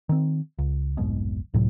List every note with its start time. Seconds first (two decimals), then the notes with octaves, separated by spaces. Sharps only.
0.09 D#3 C4
0.59 C#2
0.97 F1 B1 G#2 B2
1.54 C#2 A2 C3 F#3